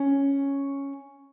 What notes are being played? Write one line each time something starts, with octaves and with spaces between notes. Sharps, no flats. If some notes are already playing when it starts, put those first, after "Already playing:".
Already playing: C#4